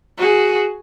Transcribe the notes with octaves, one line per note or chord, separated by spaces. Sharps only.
F#4 G#4